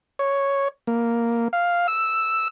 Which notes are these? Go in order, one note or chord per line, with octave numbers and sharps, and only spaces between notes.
C#5
A#3
F5
E6